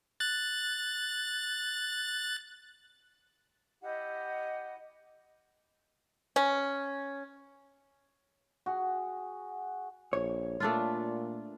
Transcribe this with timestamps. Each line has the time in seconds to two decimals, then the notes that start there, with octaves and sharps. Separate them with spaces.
0.20 F#6 A6
3.81 E4 G4 D#5 F#5
6.36 C#4
8.66 F#4 G#4
10.13 A#1 C#5
10.60 A#2 A3 D4 F4